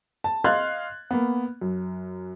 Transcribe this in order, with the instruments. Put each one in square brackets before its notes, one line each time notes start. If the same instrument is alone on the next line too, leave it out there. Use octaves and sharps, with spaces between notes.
[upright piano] A5
D#5 F5 C6 F#6 G#6 A6
A#3 B3
F#2